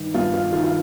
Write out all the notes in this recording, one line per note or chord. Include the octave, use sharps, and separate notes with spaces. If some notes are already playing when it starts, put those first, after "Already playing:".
Already playing: G2 D#3
G2 F4
F4
D#3 F4
F4